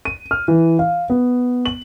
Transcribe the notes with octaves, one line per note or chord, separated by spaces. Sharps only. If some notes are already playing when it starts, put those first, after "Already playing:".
D#7
F6
E3
F5
B3
F#7